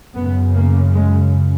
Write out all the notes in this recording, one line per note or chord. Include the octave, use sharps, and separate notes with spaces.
F#2 C#3 B3
A#3
G#3